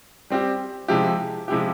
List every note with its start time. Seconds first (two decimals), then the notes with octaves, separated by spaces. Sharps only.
0.30 G3 C4 G4
0.88 C3 F3 G#3 E4 G4
1.48 C3 F3 G#3 E4 G4